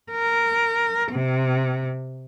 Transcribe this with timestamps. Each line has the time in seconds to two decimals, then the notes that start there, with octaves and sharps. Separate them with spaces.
0.12 A#4
1.12 C3